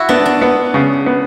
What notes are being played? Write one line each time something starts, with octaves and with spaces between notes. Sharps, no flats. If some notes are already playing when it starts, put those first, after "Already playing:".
Already playing: E4 F#4
B3 D4
D4
B3
C#3
B3